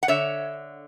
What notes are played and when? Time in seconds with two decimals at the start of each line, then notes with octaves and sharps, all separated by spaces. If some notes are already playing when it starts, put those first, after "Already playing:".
0.03 F#5
0.08 D3 C#5 E5